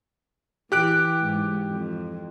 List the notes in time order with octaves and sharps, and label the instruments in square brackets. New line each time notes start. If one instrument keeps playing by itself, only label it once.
[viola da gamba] E3 [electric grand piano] G4 F#6 D7
[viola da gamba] G#2
F2